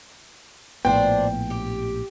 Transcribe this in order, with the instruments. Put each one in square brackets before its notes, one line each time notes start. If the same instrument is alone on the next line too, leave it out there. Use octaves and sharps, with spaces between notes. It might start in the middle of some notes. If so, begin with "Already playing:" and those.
[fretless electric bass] A#1 A2 B3 [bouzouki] D4 C5 [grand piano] G5
[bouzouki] G4